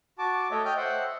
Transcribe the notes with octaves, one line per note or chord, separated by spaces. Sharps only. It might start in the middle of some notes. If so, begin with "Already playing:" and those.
F#4 A5 D6
A3 C#5 D#5 E5
D#5 G5 F6 G6
C5 E5 F#5